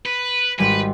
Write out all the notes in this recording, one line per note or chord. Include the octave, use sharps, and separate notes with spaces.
B4
G#1 G3 B4 G#5